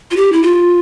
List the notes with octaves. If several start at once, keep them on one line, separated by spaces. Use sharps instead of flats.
F4
G4
E4
F4